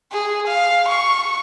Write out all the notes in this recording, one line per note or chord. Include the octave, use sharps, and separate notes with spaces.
G#4
F5
C#6